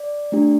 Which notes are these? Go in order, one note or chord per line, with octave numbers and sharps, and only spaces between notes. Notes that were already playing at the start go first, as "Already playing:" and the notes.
Already playing: D5
A3 D4 G4